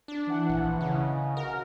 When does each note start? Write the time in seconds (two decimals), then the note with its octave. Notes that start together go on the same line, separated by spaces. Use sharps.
0.08 D4
0.27 E3 F#5
0.49 A#1
0.81 C#3
0.99 D#5
1.37 F#4 A#4